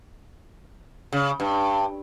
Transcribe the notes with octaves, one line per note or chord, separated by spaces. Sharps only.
C#3
G2